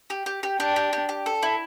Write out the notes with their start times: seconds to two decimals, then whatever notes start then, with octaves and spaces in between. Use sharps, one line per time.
0.10 G4
0.26 G4
0.43 G4
0.60 D4 G4
0.76 G4
0.93 G4
1.09 G4
1.26 A4
1.43 E4